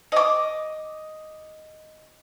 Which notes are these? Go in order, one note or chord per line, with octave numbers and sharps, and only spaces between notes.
D#5 D6